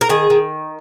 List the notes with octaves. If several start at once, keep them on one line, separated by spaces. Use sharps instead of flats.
A#4
D#3 G#4
D#3